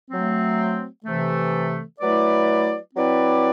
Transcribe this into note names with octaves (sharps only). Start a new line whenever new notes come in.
F#3 A3 C4
C3 E3 A3
F#3 A3 E4 B4 D5
F#3 C4 E4 B4 D5